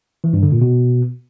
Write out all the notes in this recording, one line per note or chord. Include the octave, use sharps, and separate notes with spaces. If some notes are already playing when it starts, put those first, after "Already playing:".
E3
G2
D3
A#2
B2